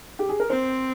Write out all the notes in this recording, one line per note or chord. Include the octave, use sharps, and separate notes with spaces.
G4
G#4
A#4
C4 C5